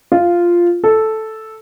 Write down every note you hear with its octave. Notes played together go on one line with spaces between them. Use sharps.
F4
A4